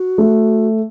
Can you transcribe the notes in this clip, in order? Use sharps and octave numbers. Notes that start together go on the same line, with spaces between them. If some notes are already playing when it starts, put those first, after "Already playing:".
Already playing: F#4
A3